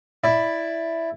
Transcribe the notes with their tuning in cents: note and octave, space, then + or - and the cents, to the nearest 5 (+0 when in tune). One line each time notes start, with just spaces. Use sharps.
E4 +0 D5 +0